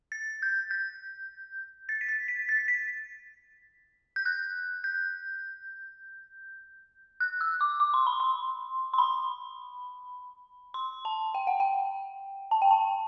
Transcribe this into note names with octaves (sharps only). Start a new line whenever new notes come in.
A6
G6
G6
A6
B6
A6
B6
A6
B6
G6
F#6
G6
F#6
E6
D6
D6
C6
B5
C6
C6
B5
C6
A5
G5
F#5
G5
A5
G5
A5